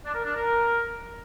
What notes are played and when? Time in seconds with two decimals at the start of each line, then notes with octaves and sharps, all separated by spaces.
0.04 D4
0.14 A#4
0.24 D4
0.34 A#4